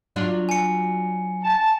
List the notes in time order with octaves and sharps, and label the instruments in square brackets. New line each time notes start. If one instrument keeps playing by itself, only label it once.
[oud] F#3 D4 F4
[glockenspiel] G#5 C#7
[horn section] A5